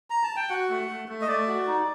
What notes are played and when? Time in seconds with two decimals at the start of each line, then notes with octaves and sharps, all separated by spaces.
0.10 A#5
0.23 A5
0.36 G5
0.50 F#4 F#5
0.69 A3
0.89 A3
1.09 A3
1.21 D#5
1.28 A3 D5
1.47 F#4
1.67 D#4